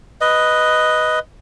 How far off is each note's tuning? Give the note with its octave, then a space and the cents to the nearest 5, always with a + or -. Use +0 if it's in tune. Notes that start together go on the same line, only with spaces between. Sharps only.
B4 +0 D#5 +0